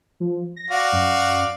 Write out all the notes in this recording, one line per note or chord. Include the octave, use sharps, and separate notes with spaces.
F3
A#6
F#4 D5 F5
F#2